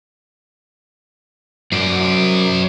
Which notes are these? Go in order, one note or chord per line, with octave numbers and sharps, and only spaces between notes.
F#2 C5 D5